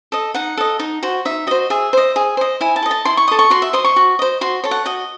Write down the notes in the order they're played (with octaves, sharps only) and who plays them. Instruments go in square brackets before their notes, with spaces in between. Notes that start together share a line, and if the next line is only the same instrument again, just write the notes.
[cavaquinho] A4 D#5
D#4 F#5
A4 D#5
D#4
F#4 C5
D#4 E5
F#4 C5 D#5
G#4 E5
C5 D#5
G#4
C5 D#5
E4 G#5
A5
A4 D#5
A5
E4 C6
C#6
A4 D#5 D#6
C#6
F#4 C6
E5
C5 D#5 C6
C#6
F#4
C5 D#5
F#4 C6
A4 C#5
F#5
F#4 D#5